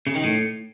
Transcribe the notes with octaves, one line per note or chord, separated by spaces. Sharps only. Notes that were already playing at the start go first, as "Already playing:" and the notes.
C#3
D#3
A2